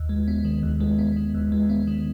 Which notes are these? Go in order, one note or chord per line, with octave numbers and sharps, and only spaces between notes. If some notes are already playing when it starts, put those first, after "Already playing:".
Already playing: D#2
G#3
B3
D#3
D#2
G#3
B3
D#3
D#2
G#3
B3
D#3